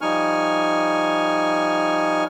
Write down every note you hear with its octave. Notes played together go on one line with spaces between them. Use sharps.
F3 G3 D#4 G#5 C#6 F6